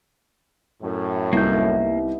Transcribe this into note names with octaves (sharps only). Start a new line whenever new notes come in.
F#2 A2
C2 A#3 B3 D#4 E5 G6